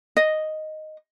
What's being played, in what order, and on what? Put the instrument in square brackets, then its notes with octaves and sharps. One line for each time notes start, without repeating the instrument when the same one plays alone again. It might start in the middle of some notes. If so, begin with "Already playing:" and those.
[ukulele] D#5